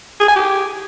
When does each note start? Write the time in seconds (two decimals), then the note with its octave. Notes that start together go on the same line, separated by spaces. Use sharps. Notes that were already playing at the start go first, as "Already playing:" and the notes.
0.20 G#4
0.28 G#5
0.36 G4